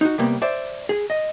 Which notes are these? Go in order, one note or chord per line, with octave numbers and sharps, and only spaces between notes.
D#4 F#4
C3 G3 A#3 B3
C5 D5 E5
G#4
D#5